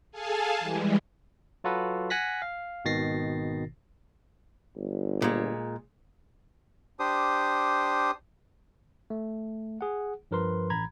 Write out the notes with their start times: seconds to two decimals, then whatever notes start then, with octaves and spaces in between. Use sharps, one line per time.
0.11 G#4 A4 F5 G#5 A5
0.59 E3 G3 G#3
1.64 F#3 F4 F#4 A4 B4
2.10 F#5 G#5 F#6 A#6 B6
2.42 F5
2.85 G#1 B2 D#3 A6 A#6 C7
4.76 G1
5.22 A#2 G#3
6.99 D4 G4 C5 D#6
9.10 A3
9.81 G#4 F#5
10.31 G2 F3 A#4 B4 C6
10.70 A1 A#5 B5 G#6